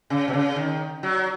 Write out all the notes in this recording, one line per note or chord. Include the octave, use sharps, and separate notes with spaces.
C#3
B2
C#3
D#3
F#3